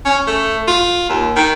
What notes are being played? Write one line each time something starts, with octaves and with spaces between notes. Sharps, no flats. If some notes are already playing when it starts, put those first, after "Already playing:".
C#4
A3
F4
D#2
D#3